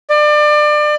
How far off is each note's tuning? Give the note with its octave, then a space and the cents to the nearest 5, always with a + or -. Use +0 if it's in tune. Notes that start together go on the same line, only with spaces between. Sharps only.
D5 +30